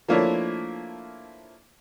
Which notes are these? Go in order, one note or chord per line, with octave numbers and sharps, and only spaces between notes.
F3 A3 A#3 D4 E4 C#5